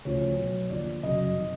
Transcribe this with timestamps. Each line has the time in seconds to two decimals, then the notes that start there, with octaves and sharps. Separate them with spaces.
0.05 D2 C#3 F3 C#5
0.37 B1 B2 F#3
0.70 D#2 D3 F3 D5
1.03 G1 F#2 C#3 F#3 D#5
1.37 C3 D#3